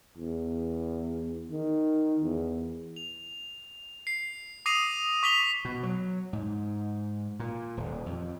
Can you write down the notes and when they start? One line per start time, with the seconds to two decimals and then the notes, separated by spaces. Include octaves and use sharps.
0.18 E2
1.51 D#3
2.23 E2
2.96 F7
4.07 C7
4.66 D6 D#6 A#6 C7 D#7 F7
5.23 C#6 D6 B6 D#7 F7 G7
5.65 B2
5.83 F#3
6.33 G#2
7.40 A#2
7.77 D#1
8.06 F2